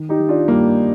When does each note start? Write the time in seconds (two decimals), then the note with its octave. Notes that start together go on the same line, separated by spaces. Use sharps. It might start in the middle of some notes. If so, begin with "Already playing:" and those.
Already playing: D#3
0.09 D#4 G4
0.20 D#3
0.29 D4 F4
0.48 G2 G3 A#3